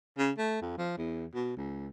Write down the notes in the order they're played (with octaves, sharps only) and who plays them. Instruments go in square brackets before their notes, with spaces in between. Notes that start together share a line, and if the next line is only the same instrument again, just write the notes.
[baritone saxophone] C#3
A3
F2
F3
E2
B2
C#2